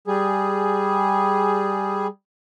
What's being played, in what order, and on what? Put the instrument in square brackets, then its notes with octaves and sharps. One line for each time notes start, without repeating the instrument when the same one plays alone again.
[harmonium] G3 G#4